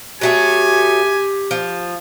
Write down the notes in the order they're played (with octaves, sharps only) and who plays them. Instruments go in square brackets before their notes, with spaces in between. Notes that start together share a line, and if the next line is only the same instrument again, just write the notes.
[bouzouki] F#3 A3 G#4 [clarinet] G4 [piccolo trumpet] G#5
[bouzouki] F3